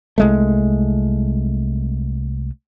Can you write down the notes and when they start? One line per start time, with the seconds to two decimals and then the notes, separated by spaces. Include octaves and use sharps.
0.18 C2 G#3 A3